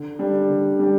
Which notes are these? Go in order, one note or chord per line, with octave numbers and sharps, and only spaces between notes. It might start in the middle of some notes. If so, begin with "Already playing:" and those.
Already playing: D3
G3 D4 G4
D3
G3 D4 G4